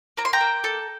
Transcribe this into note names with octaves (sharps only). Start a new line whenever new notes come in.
A#3 A#5
C6
G5 A#5
A#3
A4